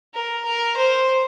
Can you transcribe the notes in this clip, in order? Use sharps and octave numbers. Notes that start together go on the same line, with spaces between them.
A#4
A#4
C5